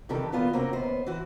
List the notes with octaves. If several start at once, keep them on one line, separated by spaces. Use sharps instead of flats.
G2 C3 D#3 E3 G4 A4
A#2 E3 B3 F4 F#4
C3 A#3 C4 C#4 F#4
D#2 B3 C5
E3 F#4